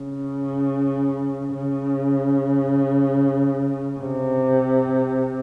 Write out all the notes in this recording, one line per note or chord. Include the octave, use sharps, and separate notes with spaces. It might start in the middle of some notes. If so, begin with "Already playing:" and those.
Already playing: C#3
C#3
C3